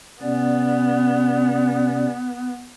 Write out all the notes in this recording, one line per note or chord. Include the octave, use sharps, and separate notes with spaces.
C3 B3 C#4 D5